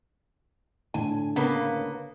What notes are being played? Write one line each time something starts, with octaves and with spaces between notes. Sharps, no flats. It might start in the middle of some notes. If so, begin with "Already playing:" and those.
A2 D3 G#5
C#3 A#3 B3